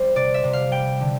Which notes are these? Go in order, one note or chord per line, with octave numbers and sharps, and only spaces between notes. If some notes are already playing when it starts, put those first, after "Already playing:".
Already playing: G3 C5
C3 D5
E5
C3
F5
G3 G5
D3